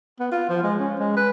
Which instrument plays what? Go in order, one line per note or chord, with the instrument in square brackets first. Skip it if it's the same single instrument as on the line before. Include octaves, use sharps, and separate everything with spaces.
[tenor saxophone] B3
F4
F3
G#3
C#4
G#3
B4